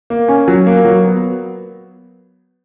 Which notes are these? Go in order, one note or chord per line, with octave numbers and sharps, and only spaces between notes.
A#3
C#4
F#3
A#3
F#3
B3